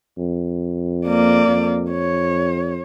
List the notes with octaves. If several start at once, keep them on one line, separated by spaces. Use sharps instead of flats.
F2
A#3 D5
F2
C#5